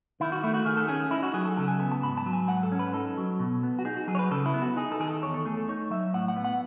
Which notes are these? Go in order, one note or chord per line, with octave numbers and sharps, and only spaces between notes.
D#3 E4
F#4
A3 E4
F#4
D#3 G#4
A4
C#4 G#4
D#4 E4
F#4
F#3 G#4
A4
C#3 A4
G#5
B3 A5
A5
G#2 B5
A5
F#3
G#5
G#2 F#5
A4
C#4
B4
D#4 A4
F#3
B2
B3
F#4
D#4 G#4
F#4
F#3 G#4
C#5
B4
C#3 A4
E4
B3
F#4
D#4 G#4
A4
D#3 G#4
A4
E2 C#5
A4
A3 G#4
A4
D#4 C#5
F#3 E5
A2 F#5
F#5
B3
F#5